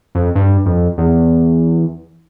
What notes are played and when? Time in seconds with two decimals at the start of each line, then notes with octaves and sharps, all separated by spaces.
0.15 F2
0.35 G2
0.66 F2
0.98 E2